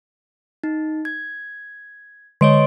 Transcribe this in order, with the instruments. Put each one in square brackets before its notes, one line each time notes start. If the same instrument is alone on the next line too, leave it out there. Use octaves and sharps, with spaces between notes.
[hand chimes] D#4
G#6
[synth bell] D3 D7 [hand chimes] C#5 D#5 C6